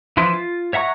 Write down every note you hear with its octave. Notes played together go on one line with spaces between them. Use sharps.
E3 F3 E4 C6
F4
C#5 E5 F#5 A#5 C#6